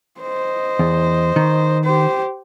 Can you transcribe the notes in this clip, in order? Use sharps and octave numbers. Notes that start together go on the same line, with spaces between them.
C5 D#5
E2
D#3
G4 C5